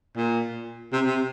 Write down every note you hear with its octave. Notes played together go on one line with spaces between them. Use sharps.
A#2
C3
C3